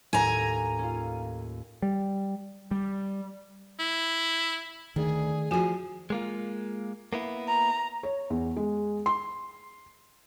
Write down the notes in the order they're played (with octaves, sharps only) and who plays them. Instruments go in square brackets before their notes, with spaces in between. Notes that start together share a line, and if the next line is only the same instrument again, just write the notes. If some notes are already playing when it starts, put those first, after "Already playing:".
[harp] D#2 A2 [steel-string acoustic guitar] G#5 A#5
[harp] C#4 F4
[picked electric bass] G3
G3
[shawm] E4
[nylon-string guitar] D2 [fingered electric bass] D#3 [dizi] G#4
[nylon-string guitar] F3 G#4 [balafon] F#4 G#5
[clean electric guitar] G#3 A#3 F4
A#3 B3 E4
[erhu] A#5
[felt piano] C#5
E2
G#3
C6